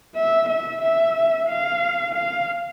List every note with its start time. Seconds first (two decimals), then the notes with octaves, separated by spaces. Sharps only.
0.15 E5
0.49 E5
0.82 E5
1.48 F5
2.14 F5